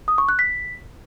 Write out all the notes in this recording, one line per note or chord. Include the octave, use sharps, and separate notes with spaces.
D#6
C#6
F#6
B6